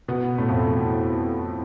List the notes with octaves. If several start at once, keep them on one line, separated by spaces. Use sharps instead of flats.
B2 B3
A2 A3
F2 F3